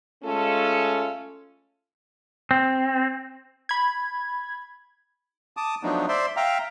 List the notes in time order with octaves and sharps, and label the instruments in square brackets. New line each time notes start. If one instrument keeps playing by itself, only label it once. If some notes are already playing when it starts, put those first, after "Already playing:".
[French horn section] G#3 A3 C#4 F4 A4
[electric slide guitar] C4
[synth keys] B5 G#6
[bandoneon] A5 D6 D#6
F3 F#3 A3 B3 D4 D#4
C5 D5 E5 C6
E5 F5 G5 A#5